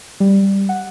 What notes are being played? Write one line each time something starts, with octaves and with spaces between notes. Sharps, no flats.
G3
F#5